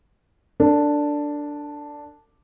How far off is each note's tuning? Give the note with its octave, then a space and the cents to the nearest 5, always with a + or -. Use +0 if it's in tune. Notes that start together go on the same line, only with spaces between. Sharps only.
D4 +0 A4 +45